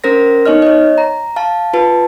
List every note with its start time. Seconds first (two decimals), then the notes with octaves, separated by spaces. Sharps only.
0.04 C#4 A#4 C5 A#6
0.46 B3 D#4 C#5 D#5 F6
0.62 C#5 D#5
0.98 A#5
1.36 F5 A5
1.74 F4 B4 A5